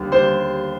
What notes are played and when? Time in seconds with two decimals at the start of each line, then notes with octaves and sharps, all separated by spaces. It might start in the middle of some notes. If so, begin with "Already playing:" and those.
Already playing: D#2 D3 G3
0.12 D#2 D3 G3 C5 C6